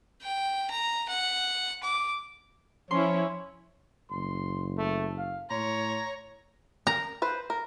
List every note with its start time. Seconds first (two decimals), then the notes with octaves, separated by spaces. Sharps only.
0.22 G5
0.70 A#5
1.08 F#5
1.84 D6
2.91 F3 C#4 E4 C#5 C6
4.11 F#1 C6
4.78 A3
5.18 F5
5.50 A2 C#5 A#5 C6
6.87 A#4 A#5
7.22 B4 C5
7.50 A#4